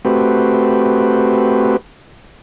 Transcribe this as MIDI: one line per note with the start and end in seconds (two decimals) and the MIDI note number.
0.05 1.77 57
0.05 1.77 60
0.05 1.77 66
0.05 1.77 67
0.05 1.77 71